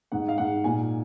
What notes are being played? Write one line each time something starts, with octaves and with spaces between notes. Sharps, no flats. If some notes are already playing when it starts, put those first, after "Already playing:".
G#2 F#5
F5
G#2 F#5
A#2 G#5